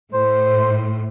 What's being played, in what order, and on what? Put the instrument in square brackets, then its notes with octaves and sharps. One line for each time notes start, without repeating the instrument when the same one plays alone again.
[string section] A2 [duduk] C5